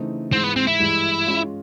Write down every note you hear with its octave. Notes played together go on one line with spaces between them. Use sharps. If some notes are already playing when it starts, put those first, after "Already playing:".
Already playing: C#3 E3 A3 C4 D#4
G#2 E3 G#3 C4
B3
C4
E4
G2 E3 G#3
G#3 C#4 F4